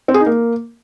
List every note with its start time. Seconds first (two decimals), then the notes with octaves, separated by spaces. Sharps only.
0.08 C4
0.14 G#4
0.20 D#4
0.26 A#3